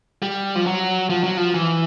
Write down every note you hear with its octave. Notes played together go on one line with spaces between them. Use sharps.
G3
F3
F#3
F3
F#3
F3
E3